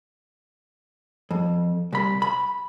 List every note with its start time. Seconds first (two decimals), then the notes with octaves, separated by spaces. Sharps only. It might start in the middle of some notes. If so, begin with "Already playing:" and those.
1.31 F2
1.93 C2 B5
2.22 B5